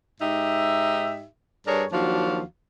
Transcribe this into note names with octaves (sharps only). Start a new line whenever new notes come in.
G#2 D#4 G4 E5
G2 D4 G#4 A#4 C#5
D#2 F3 F#3 D4 F#4 F5